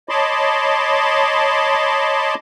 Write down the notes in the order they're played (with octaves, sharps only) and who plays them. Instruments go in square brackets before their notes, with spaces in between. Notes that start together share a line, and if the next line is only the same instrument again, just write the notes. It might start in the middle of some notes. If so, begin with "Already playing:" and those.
[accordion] C#5 D#5 A5 B5 C6 D6